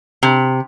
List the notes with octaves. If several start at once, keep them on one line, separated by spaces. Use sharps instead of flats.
C3